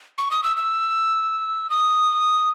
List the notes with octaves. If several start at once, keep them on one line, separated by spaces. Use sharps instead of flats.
C#6
D#6
E6
E6
D#6